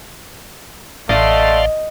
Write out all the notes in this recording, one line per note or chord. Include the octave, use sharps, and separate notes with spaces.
A1 A3 D5 D#5 F5 C6